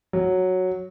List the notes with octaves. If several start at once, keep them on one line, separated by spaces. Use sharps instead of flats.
F#3